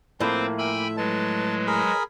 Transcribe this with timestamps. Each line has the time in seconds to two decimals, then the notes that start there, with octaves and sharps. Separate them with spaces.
0.20 A2 F3 A3 A#3 C4 B4 C5
0.58 E5 G5 G#5 B5
0.97 F#3 G#3 B4 A5
1.67 G#4 A#4 B5